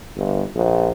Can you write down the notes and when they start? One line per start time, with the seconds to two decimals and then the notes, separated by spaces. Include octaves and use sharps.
0.16 G1
0.56 A#1